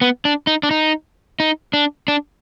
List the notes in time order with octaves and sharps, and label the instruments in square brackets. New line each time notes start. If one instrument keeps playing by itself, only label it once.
[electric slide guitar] B3
D4
D#4
D4
D#4
D#4
D4
D4